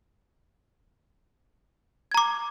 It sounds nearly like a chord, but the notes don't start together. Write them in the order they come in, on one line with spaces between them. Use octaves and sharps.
G#6 A#5 D6